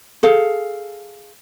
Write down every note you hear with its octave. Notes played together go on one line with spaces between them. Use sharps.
G#4 A4 F5